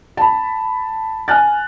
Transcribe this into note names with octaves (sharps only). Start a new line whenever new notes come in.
A5 B5
G#5 F6 F#6 A6